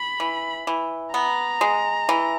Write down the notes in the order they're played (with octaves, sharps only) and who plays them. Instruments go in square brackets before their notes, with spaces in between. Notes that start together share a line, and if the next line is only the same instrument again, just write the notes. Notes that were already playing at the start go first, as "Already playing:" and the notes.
Already playing: [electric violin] B5
[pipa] E3
E3
[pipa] B3 [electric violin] A#5
[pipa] G#3
E3